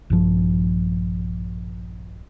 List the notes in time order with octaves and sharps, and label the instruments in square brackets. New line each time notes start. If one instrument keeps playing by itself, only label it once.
[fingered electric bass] A#1 G2 F3